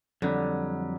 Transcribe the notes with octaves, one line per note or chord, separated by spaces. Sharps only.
F2 D3 F#3 G3